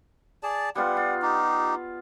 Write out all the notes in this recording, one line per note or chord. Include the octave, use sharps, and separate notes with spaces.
G#4 D5 A5
G3 B3 F4 F#5
F4
D#4 G4